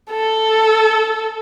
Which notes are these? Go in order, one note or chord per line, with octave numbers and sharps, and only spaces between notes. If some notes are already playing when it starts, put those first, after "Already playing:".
A4